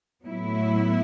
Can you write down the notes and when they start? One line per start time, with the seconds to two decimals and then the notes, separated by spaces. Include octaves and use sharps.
0.24 A2 F#3 B3 E4